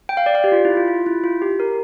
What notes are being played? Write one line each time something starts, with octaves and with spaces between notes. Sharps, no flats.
G5
F5
D5
F5
G4
F4
E4
F4
F4
E4
F4
G4
A#4